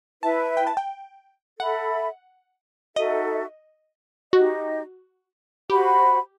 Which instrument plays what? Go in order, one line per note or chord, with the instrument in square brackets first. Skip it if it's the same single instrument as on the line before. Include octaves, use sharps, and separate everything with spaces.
[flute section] E4 B4 E5 [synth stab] A5
[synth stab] G5
A5
G5
[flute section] A4 E5 B5 [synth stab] F#5
[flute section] D#4 F#4 A4 E5 [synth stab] D#5
[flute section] D#4 G4 D#5 [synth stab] F#4
[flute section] F#4 C5 F#5 B5 [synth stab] G4